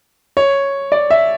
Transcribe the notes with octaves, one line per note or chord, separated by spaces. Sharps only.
C#5
D5
E5